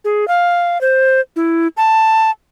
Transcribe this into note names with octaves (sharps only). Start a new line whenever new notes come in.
G#4
F5
C5
E4
A5